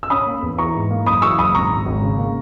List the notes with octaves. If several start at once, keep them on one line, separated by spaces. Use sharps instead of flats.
E6
C#4 B5 D#6
A#3
E2
E3 A#5 C#6
G#2
A#3
F#1 B5 D#6
E3 C#6 E6
F#1 B5 D#6
G#1 A#5 C#6
G#1
G#1
C#3
A#3